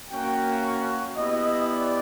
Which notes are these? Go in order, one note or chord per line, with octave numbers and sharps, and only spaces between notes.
A#3 C#4 F#4 G5
B3 E4 G4 D#5
D5